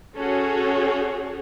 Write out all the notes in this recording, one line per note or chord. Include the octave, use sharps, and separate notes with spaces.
C#4 F#4 G#4 A4 C#5